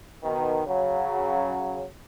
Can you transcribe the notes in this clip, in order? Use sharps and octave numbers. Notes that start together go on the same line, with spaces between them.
B2 D#3
C#3 F#3